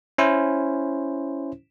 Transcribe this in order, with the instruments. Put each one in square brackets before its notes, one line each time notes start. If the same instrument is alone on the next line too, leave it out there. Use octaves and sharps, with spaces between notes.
[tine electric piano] C#4 E4 C5